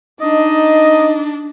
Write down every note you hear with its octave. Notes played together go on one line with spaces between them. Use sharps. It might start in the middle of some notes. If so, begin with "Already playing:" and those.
D4 D#4 D#5